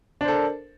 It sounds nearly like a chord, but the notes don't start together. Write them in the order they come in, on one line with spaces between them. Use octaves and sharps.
D4 C5 A4 A#4